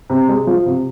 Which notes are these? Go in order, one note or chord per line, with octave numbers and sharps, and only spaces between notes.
C3
G#3
F3
C3